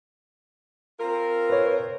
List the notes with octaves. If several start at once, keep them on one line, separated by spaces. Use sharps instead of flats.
C4 F4 A#4
B4 C#5